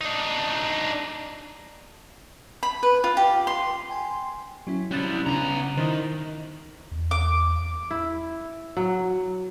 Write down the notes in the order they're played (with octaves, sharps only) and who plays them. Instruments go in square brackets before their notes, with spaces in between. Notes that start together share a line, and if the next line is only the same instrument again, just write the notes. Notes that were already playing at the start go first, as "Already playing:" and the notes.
[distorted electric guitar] D4 D#4
[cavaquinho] B5
B4
F4
G4
C6
[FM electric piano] G5 G#5 C6
F#3 C#4 E4
[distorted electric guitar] G3 E4 [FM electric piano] C#4 F#6 A6
[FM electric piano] C#3 C#4 D4 [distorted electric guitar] B3 A#5
[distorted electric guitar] D#3 [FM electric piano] E4 C5
[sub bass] E2
[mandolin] D6
[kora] E4
F#3